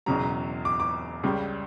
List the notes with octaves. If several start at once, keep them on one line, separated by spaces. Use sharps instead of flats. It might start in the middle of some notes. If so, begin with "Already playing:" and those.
E1 E2 C#3 F#3 A#5
D6
D6
C#2 C#3 G3